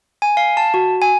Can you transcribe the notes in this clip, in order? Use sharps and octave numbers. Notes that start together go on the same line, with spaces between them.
G#5
F5
A5
F#4
G#5